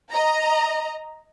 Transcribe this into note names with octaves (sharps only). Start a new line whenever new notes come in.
D#5 A#5